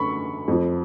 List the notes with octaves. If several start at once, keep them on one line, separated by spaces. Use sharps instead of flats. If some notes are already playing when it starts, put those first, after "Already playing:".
Already playing: F#2 D3 B5 C#6
F2 F3